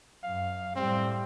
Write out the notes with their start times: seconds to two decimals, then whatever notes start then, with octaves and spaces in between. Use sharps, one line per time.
0.24 F#2 F5
0.76 A2 G3 C4